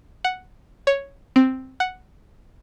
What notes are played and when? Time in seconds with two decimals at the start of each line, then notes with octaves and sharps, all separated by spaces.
0.24 F#5
0.87 C#5
1.36 C4
1.80 F#5